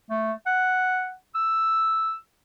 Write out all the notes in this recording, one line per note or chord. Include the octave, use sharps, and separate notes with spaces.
A3
F#5
E6